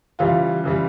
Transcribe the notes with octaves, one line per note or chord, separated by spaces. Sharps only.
C#3 E3 G3 F4
C#3 E3 G3